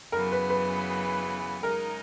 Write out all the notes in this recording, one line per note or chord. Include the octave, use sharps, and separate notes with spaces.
F#2 C#3 E3 B3 A#4
B4
B4
C#3 G#3 D#4 A#4